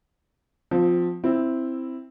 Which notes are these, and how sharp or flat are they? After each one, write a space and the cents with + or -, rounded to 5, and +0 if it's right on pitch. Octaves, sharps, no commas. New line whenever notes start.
F3 +15 C4 -15
C4 +0 E4 +0